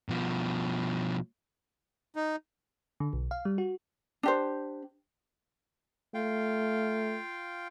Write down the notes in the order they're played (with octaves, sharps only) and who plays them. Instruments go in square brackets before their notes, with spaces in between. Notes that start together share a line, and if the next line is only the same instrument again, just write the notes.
[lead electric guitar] B2 F3
[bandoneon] D#4
[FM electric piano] D3
B1
F5
G3
F#4
[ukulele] D4 G4 C5
[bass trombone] A3 [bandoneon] F4 F5 G5